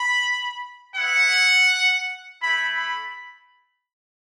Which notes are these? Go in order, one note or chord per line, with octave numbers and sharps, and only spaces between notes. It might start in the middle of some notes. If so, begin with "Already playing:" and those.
Already playing: B5
B3 E4 F#5
A3 E4 B5
B5